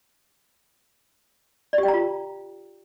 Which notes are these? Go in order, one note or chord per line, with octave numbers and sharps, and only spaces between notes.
D5
G4
G5
A#5
F4